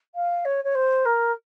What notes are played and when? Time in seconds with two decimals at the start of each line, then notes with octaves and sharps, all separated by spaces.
0.15 F5
0.45 C#5
0.64 C#5
0.75 C5
1.05 A#4